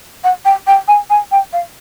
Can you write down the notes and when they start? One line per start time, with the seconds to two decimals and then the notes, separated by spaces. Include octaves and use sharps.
0.24 F#5
0.45 G5
0.67 G5
0.88 G#5
1.10 G#5
1.32 G5
1.53 F5